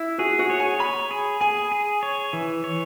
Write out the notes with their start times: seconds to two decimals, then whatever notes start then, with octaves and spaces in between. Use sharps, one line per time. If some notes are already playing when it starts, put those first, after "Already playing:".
Already playing: E4
0.18 F#4 G#4
0.39 F#4
0.50 C#5
0.60 G#5
0.79 C#5 B5
1.11 G#4
1.41 G#4 G#5
1.72 G#4
2.03 C#5
2.33 E3
2.64 C#5